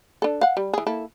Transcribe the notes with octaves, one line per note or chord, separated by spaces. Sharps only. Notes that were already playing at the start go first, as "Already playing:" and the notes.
D4 A4
F5 F#5
G3
E3 G#4
A#3 E4 A4